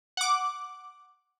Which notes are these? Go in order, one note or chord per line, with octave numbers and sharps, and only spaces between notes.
F#5 D6